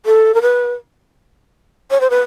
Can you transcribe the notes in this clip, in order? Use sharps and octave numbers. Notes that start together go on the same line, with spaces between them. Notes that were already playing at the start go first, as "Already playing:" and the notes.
A4
A#4
B4
C#5
C5
B4